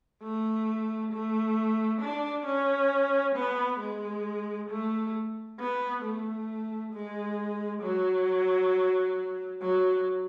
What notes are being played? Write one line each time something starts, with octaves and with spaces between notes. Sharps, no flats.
A3
A3
D4
C#4
B3
G#3
A3
B3
A3
G#3
F#3
F#3